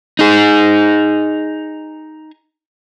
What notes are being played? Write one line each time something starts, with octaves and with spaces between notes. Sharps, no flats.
D#4 G#4